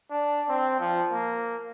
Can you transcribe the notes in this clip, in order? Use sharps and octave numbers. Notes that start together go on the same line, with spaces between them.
D4
C4
F3
A#3